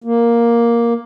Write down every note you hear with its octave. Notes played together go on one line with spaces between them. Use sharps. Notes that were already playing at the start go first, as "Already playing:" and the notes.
A#3